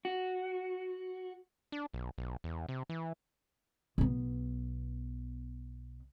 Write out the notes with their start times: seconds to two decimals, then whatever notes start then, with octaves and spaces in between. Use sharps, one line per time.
0.05 F#4
1.72 D4
1.94 B1
2.18 B1
2.44 E2
2.69 C3
2.89 E3
3.98 B1 B3